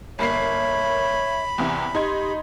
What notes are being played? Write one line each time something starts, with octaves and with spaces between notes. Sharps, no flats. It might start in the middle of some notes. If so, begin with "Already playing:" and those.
G1 A#3 C#5 E5 B5 C7
E2 C3 E3
D#4 G4 C6 G#6